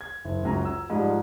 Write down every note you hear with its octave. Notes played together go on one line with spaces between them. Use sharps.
G#6
F#1
C#2 F#2 A#5
E6
G#2 F3 G3